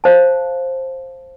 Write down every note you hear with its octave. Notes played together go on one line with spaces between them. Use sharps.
C5 F5 A5